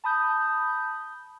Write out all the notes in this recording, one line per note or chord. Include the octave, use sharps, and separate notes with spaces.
A5 B5 D#6 G6